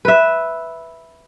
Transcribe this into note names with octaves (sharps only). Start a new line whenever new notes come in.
B4 E5